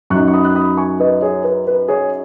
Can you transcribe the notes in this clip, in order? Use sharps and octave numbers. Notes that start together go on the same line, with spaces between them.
F#2 F#3 D#4 C#6 F#6
C#6
B5 D#6
F#6
B5 D#6
G#5 C#6
B4 D#5
G#4 C#5
B4
B4
G#4 C#5